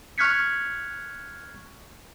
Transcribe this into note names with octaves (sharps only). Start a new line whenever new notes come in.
C#6 F6 F#6 G#6 B6 C#7